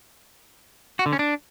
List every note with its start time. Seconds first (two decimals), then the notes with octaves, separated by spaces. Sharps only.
0.99 F#4
1.06 D3
1.13 C#4
1.19 D4